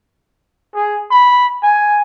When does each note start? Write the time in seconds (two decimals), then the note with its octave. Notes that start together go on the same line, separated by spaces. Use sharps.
0.74 G#4
1.11 B5
1.63 G#5